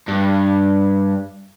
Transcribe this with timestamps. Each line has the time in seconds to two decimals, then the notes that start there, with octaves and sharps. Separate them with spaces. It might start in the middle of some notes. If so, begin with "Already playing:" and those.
0.08 G2